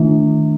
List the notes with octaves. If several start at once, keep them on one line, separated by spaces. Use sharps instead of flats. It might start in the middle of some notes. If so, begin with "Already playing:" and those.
Already playing: D#3 A3 D4